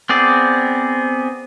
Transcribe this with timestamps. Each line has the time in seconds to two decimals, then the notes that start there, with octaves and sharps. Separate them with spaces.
0.09 B3 C4 G#4 D5